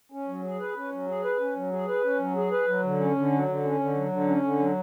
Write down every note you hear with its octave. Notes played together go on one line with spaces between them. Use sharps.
C#4
F#3
G#4
B4
C#4
F#3
G#4
B4
C#4
F#3
G#4
B4
C#4
F#3
G#4
B4
F#3
D3
C#4
D3
F#3
D3
C#4
D3
F#3
D3
C#4
D3
F#3